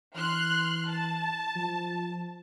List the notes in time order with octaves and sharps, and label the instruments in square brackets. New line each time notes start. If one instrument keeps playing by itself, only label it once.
[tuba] E3 [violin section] C6 F6 F#6
[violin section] A5
[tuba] F3